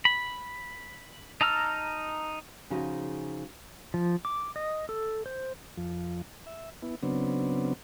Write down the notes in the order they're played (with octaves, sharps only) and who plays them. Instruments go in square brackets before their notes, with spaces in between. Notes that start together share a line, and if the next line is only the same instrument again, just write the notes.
[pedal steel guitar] B5
D#4 A5 A#5 E6 F6
[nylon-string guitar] C#3 F3 D#4 F#4 G#4
[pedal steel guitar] F3
D6
D#5
A4
C5
[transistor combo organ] F2 F3
E5
B3 E4
C#3 F#3 B3 C4 D4